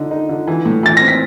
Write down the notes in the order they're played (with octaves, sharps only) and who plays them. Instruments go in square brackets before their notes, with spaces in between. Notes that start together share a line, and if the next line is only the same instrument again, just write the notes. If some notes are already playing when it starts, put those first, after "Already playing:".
Already playing: [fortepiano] D3 D#4
D#4
D3
E3
A2
[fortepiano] E3 [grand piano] A6
[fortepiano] C4 [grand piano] A#6
[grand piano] B6